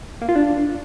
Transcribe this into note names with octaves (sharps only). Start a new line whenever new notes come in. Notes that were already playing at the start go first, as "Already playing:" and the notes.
A#3
F4
D4